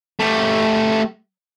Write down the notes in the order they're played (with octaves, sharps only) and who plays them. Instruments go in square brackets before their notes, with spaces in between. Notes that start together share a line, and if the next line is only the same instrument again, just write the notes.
[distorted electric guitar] A3 G4